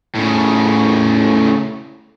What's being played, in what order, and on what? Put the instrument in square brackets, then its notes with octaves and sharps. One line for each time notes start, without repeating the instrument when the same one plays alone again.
[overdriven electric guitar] A2 C#3